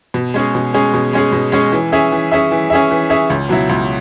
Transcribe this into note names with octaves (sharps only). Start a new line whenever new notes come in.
B2
G#3 C#4 G#4
B2
G#3 C#4 G#4
B2
G#3 C#4 G#4
B2
G#3 C#4 G#4
E3
C#4 G#4 E5
E3
C#4 G#4 E5
E3
C#4 G#4 E5
E3
C#4 G#4 E5
C#2
B2 F#3 E4
C#2